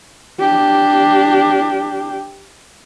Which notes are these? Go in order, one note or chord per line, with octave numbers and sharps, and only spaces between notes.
D4 G4